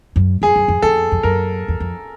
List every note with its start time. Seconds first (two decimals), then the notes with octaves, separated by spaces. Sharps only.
0.16 F#2
0.42 F2 G#4
0.56 F#2
0.68 F2
0.82 F2 A4
1.12 F2
1.23 F#2 A#4
1.68 E2
1.80 F2